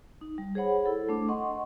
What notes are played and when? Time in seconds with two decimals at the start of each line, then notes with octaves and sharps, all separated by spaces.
0.21 D#4
0.38 G3
0.55 G#4 C5 C#5 F#5 B5
0.86 E4 A4
1.09 A3 D4 D6
1.28 D#5 F#5 C6 C#6